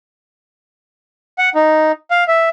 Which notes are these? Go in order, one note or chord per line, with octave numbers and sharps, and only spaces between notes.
F#5
D#4
F5
E5